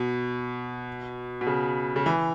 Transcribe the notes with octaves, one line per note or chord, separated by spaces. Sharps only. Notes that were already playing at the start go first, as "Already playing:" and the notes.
Already playing: B2
B2
C#3
C#3
E3